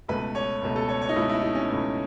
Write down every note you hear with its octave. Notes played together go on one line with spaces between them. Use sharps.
C#2 B2 A3 B4
C#5
C#2 B2 A3
A4
C#5
C#5
D#4
C#2 B2 A3 E4
E4
D#4
C#4
C#2 B2 A3